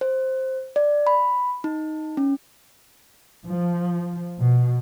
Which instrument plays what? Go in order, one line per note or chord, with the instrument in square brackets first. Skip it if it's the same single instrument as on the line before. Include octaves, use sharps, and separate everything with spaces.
[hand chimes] C5
D5
B5
D#4
C#4
[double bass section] F3
B2